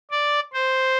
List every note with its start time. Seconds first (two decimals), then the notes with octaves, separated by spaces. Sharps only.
0.11 D5
0.54 C5